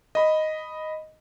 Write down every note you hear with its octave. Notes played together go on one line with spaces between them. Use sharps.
D#5 B5